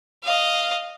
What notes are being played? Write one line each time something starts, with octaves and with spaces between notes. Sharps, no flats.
D#5 F5